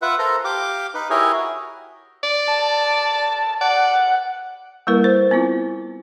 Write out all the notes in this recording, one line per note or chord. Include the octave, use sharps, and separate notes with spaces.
F4 B4 E5 F#5
A4 A#4 C5 A#5
G4 F5 D6
D#4 B4
E4 G4 G#4 A#4 C#5
F#4
D5
A5
D5 F#5
G3 A#3 E4 A#4 B4
C5
B3 C4 E4 F4